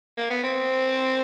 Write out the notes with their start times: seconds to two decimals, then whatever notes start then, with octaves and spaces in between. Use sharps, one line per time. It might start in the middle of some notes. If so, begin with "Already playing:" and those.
0.17 A#3
0.30 B3
0.44 C4